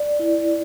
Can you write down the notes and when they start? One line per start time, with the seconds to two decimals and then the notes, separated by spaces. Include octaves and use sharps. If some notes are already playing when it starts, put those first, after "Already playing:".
Already playing: D5
0.19 E4